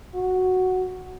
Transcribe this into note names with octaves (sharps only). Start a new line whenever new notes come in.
F#4